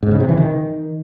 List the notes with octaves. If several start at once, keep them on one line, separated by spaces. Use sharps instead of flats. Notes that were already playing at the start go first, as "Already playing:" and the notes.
G#2
C#3
C3
E3
D#3